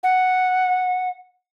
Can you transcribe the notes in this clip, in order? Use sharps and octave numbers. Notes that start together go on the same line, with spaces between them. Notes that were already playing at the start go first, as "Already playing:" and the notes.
F#5